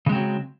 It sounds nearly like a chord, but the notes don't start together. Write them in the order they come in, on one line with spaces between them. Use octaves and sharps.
C#3 G#3 C4 F#3